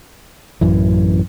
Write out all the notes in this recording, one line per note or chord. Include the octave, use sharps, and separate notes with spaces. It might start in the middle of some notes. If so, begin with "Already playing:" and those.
A1 F#2 E3